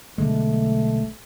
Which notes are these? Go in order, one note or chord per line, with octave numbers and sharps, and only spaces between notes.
B1 D3 G#3 A3